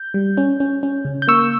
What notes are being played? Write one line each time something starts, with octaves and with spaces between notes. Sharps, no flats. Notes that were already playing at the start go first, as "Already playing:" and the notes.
Already playing: G6
G3
C#4
C#4
C#4
C#3
G6
A#3 C#6 E6